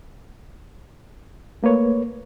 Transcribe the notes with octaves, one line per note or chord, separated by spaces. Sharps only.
A3 A#3 B4 C#5